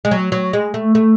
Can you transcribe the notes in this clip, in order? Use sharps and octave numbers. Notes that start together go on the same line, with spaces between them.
G#3
F#3
F#3
G#3
A3
A3